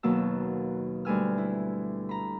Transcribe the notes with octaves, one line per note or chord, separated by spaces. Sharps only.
D#2 B2 F#3 A#3 A5 E6
D2 G3 B4 G#5 E6 F6
E4
A#5 B5